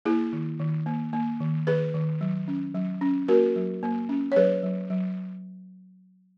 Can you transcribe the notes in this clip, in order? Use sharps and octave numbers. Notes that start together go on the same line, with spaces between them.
A#3 E4 G#4
D#3
D#3
A#3
A#3
D#3
D#3 G#4 B4
D#3
F#3
C#4
F#3
C#4
A#3 F#4 A#4
F#3
A#3
C#4
C#5
F#3 G#4 B4
F#3
F#3